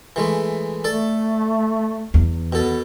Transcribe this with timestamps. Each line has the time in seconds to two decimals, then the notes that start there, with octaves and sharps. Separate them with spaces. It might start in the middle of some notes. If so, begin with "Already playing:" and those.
0.16 E3 G#3 A3
0.84 A3 A4 D5
2.14 E2
2.53 B2 B3 A4